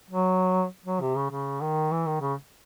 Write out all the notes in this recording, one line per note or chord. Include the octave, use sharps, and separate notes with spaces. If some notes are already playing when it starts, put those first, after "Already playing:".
F#3
F#3
C3
C#3
C#3
D#3
E3
D#3
C#3